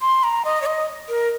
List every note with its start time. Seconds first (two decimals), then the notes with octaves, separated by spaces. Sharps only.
0.02 C6
0.23 A#5
0.45 D#5
0.62 C#5
0.66 D#5
1.09 A#4